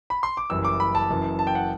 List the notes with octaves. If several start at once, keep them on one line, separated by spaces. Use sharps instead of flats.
B5
C6
D6
F#1 F#2 E3 G3 E6
D6
B5
A5
F#1 F#2 E3
A5
G5
F#5